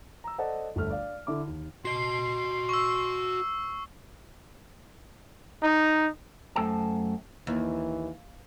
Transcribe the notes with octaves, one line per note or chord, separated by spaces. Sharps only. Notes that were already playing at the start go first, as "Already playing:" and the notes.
A#5 E6
A4 C5 D5 D#5 F#5 A5
G1 D2 A3 F6
D5 F5
D3 E4 D6
D#2
F#4 D#5 C6 C7
C#6 E6
D#4
F#2 A3 A4 C5 G5 A5
D#2 E3